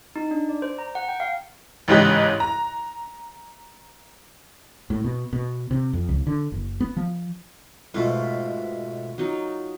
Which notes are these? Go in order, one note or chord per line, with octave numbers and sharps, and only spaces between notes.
D#4
D4
D5
C5
A#5
F#5
G5
F5
A1 G#2 C#3 G4 D#5 F#6
A#5
A2
B2
B2
C3
F2
C#2
D3
F#1
B3
F3
G#2 B2 A3 F4 F#4 C5
F#3 D#4 F4